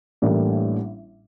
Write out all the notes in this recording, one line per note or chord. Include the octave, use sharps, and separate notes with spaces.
A1 A2 G3 A#3 D4